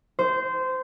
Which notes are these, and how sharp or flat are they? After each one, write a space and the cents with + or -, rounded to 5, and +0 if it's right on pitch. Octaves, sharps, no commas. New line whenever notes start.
C5 -20